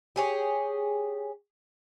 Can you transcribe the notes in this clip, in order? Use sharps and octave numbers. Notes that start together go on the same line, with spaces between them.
G4 G#4 C#5